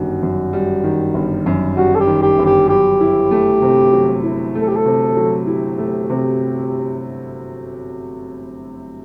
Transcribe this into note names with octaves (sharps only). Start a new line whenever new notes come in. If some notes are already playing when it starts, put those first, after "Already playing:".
Already playing: G1 F#2 D#3 G3 F#4
F#2
G3
D#3
G1
F#2
G3 F#4
A4
G4
D#3
G4
G1
G4
F#3 G4
E4
A3
C3
F#3
E4
A3
A4
G4
A4
C3
F#3
E4 G4
A3
C3